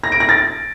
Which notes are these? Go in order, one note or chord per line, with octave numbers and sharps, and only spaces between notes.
A#6
D7
A#6
A6